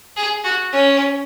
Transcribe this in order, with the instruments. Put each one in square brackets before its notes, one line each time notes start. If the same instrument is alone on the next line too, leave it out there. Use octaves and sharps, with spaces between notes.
[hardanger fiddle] G#4
F#4
C#4